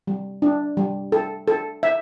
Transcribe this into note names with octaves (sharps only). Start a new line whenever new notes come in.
G3
D4
G3
A4
A4
E5